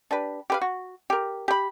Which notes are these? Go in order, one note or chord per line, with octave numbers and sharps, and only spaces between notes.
D4 G4 B4
G4 B4 F5
F#4
G4 A#4
G4 B5